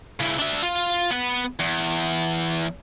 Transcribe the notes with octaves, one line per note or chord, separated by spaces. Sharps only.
C#3 E3
D4 E5
F4
B3 B4
E2